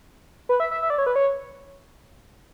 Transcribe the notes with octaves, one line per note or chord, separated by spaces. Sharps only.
B4
E5
E5
E5
D5
C#5
B4
C#5